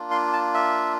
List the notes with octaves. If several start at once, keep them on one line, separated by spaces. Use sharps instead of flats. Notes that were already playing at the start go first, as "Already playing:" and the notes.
Already playing: A#3 D4 F4
C6
A5
E5